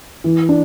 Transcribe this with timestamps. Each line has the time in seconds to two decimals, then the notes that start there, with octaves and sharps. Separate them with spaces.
0.24 E3
0.49 D4